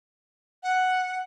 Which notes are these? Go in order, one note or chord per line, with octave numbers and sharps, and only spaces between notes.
F#5